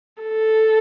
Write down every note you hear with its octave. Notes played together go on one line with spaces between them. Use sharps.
A4